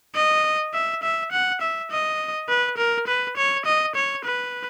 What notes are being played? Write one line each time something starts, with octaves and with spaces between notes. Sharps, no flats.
D#5
E5
E5
F#5
E5
D#5
B4
A#4
B4
C#5
D#5
C#5
B4